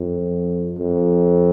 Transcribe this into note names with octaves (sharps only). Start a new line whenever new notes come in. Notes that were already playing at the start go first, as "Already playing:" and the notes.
Already playing: F2
F2